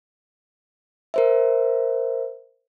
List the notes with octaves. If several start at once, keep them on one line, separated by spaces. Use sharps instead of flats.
A#4 C5 E5